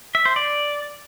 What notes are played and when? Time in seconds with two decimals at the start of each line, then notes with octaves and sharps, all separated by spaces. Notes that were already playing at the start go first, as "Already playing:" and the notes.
0.15 E5
0.25 C5
0.36 D5